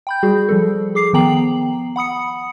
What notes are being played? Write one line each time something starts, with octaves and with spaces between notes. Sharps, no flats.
G5 B5 G6
G3 F#4 G#4
F3 G3 A4
G#4 D6 C7
D#3 F3 B3 G5 A#5 F#7
F#5 B5 D#6 C#7